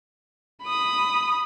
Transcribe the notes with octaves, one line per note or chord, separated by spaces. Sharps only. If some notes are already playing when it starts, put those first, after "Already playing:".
B5 D#6